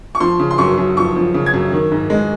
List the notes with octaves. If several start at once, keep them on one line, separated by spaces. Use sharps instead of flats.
C#6
F3 C6
C#3
C6
F#2 C#6
F#2
F3 C#6
F3
C#3
G#6
F#2
D#3
G#2
G#3